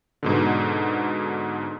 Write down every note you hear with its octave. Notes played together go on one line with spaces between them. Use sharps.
G#2 B2 D3